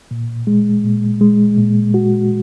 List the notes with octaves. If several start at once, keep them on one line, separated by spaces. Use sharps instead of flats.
A#2
G#3
A#2
G#3
A#2
F#4